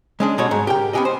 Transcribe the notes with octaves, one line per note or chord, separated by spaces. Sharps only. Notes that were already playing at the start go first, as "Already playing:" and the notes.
G#3 C#4 D4
B2 G3 F#4 A4 C#5
G#2
G4 A#4 G5
B3 C#4 E4 G4 G#4 D#5
C5